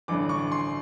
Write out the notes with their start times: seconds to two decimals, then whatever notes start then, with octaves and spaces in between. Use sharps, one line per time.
0.08 A1 G2 D3 D6
0.29 C#6
0.52 C6